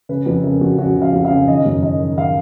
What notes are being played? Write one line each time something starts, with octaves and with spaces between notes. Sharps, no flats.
C#3 B4
F2 B4
C#3 A#4
F2 F#4
C#3 F#4
C#3
F5
F2
F5
C#3
D#3 D#5
F#2
D#3 D#5
D#3
D#3 F5